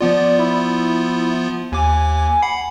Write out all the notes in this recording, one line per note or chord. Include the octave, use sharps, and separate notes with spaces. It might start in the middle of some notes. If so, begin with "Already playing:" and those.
F3 B3 F4 D5
E4
D#2 G#5 D6
F#5 B5 C7